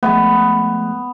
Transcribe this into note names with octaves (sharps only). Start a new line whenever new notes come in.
F3 G#3 A3 B3